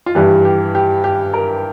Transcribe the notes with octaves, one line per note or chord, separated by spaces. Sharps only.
F4
G2 E3 G3 G4
G4
G4
G4
A#4